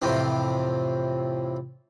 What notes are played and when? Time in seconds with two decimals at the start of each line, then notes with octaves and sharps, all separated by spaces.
0.02 F2 A2 C3 E3 C4